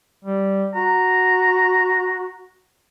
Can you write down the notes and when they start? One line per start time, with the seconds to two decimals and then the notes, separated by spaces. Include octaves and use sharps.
0.25 G3
0.75 F#4 A#5